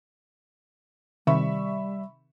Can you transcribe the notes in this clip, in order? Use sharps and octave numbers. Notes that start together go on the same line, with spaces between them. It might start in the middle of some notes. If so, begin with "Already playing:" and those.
C3 D#3 G3 E5 B5 C#6